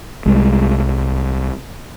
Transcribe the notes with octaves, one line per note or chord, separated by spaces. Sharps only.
C2 G3 G#3